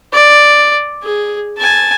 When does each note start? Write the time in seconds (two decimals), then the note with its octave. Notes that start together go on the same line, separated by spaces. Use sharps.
0.13 D5
1.03 G#4
1.58 G#5 A5